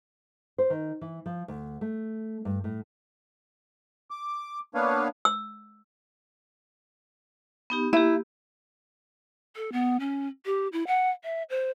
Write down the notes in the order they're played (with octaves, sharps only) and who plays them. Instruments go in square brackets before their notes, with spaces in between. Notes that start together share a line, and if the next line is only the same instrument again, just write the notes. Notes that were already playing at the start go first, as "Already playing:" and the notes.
[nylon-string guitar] C5
D#3
E3
F3
D2
A3
G2
A2
[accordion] D6
A#3 B3 D4 B4 C#5 F5
[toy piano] E6
[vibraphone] B3 D#4 G4
[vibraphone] A#3 G4 [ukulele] E4
[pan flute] A4
B3
C#4
G4
E4
F#5
E5
C5